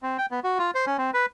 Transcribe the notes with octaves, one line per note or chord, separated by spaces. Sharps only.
C4
G5
B3
F#4
F4
C5
C#4
C4
B4